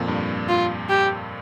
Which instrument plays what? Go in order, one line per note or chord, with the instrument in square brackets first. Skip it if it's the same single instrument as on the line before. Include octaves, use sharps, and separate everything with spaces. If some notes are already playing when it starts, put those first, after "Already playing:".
Already playing: [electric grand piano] F2 A#2
G2
[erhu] F4
G4